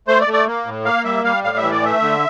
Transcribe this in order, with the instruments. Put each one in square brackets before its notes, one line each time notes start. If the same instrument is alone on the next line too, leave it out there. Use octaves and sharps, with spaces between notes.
[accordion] A3 C5
D5
A3
D5
A#3
A2
A#3 F5
G3 E5
G3 F5
A2 F5
E5
E3
D5
A3 E5
D3